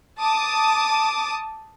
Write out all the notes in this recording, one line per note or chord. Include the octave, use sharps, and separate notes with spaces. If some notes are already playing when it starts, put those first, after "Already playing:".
A5 D6 D#6